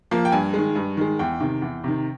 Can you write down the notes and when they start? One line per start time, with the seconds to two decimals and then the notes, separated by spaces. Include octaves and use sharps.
0.11 F3 A#3
0.25 G5
0.32 G2 G#5
0.54 D#3 G#3
0.75 G2
0.97 D#3 G#3
1.19 E2 G5
1.40 C3 D#3
1.62 E2
1.84 C3 D#3